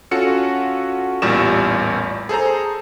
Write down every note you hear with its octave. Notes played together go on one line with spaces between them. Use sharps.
C#4 F4 F#4 A4 C#7
A1 E2 A#2 G3 C#6 E7
G#4 A4 C5 A#5